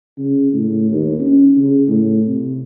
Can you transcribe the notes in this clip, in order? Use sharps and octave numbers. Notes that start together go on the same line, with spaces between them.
C#3
A2
D#2
C#4
C#3
A2
C3